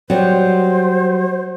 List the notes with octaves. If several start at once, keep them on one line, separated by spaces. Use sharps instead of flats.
F#3 G3 C5